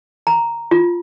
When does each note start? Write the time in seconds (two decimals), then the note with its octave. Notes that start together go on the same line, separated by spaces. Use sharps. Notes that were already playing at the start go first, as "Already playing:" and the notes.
0.27 A#5
0.71 F4